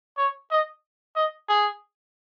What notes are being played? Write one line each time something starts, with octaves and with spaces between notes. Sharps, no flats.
C#5
D#5
D#5
G#4